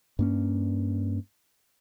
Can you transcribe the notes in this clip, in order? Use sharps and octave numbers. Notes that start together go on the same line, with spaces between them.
G2 A#3 C#4